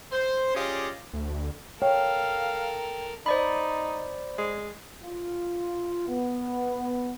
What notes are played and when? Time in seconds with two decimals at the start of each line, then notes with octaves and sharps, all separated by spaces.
0.12 C5
0.55 C#4 F4 G4 G#4 D5 D#5
1.13 D2
1.82 A4 A#4 C#5 F5 G5
3.26 D#4 C5 D5 B5
4.38 G#3
5.03 F4
6.09 B3